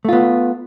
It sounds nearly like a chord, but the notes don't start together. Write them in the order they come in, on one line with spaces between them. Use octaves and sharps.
A3 F4 B3